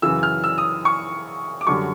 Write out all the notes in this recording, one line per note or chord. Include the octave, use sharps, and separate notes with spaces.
F#2 C#3 E3 E6
F6
E6
D#6
C#6
D6
F#2 D3 G3 C#6